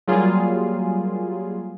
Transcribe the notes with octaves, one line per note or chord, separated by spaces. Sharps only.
F#3 G3 A#3 F4 G#4